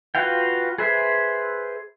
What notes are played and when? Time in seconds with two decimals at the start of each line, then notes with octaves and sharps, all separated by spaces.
0.15 F4 F#4 B4 F5 G5
0.78 G#4 B4 C5 E5